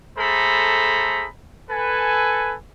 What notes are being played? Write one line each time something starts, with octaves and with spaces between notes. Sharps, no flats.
A3 G#4 A4 C5 A#5 B5
A4 B4 G#5